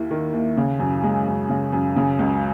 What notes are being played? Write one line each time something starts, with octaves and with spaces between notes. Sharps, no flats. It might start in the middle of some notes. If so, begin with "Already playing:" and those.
Already playing: D#2 A#3 E4
D#3
D#2
C#3
F#2
G#3
F#2
C#3
F#2
C#3
C#2